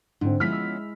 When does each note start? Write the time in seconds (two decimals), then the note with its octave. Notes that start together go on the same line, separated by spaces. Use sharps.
0.21 G#2 D3 C4
0.40 F3 G#3 B3 C#4 E4 F6 B6
0.53 E6